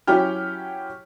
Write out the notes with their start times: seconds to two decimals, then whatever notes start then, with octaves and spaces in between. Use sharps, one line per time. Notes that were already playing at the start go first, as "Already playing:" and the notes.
0.07 F#3 C#4 E4 G4 G5 F6